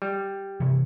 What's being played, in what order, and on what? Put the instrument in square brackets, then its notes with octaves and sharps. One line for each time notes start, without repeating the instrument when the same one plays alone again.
[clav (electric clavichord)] G3
[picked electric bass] C3 E3